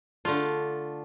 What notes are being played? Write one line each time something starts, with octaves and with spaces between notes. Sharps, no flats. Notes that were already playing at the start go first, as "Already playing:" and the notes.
D3 A3 D4 F4